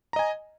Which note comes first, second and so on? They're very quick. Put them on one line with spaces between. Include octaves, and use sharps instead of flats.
A#5 D#5 G#5